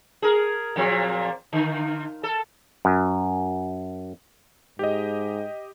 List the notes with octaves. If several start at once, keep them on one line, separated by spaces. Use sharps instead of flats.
G#4 A#4
A#2 F3 C4
D3
A4
F#2
G#2 G4 D#5